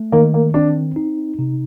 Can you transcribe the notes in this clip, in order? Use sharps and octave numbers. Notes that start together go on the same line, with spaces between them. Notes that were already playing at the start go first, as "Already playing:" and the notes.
Already playing: A3
D#3 A#3
A#3
C4 D4
D#4
C3